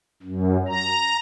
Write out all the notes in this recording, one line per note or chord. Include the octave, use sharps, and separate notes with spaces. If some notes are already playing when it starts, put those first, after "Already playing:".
F#2
A#5